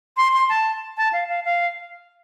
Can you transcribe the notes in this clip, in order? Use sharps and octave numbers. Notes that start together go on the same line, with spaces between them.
C6
C6
A5
A5
F5
F5
F5